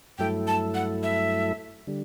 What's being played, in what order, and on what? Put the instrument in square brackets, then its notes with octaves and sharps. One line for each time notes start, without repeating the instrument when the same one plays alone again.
[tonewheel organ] G2 F#3 A3 E4 A4 [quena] G5
[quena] A5
F#5
E5
[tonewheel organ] D3 G3